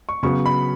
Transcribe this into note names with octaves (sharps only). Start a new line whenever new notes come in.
C#6
C#3 F#3 B3 C#6
B5